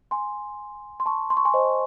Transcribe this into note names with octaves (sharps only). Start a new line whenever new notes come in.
G#5 C6
C6
A5 C#6
C6
C#6
G#5 C6
C5 D#5